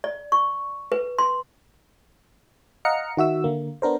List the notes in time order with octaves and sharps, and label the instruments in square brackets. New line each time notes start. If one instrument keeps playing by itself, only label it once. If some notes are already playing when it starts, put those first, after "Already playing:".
[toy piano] D5
C#6
B4
C6
[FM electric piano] D#5 F5 F#5 A#5 F6 C#7
D#3 F#4 E5 E6
D3 A#3
B3 D4 A#4 C5